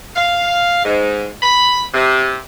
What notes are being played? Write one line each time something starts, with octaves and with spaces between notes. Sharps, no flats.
F5
G#2
B5
C3